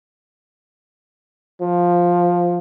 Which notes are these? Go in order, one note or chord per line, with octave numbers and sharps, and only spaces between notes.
F3